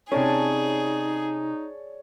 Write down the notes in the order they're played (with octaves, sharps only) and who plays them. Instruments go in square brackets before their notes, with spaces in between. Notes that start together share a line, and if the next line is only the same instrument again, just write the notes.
[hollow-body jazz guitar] C3 C#4 [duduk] D#4 [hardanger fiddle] G#4 [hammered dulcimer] C#5 D5 A5